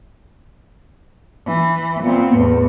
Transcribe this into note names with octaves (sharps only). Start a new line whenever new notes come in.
E3
A#2 B3 C4
E2 A2 B3